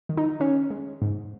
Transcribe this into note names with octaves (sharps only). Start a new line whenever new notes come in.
D#3
D#4
D#3 C#4
G#3
G#2